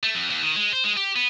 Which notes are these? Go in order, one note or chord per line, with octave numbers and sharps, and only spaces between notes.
A3
F2
D#2
D#3
G#3
C5
G#3
G4
B3